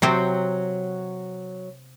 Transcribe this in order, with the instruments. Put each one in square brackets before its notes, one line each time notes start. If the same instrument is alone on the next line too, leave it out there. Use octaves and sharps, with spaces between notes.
[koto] C3 C4 C5 [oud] F#3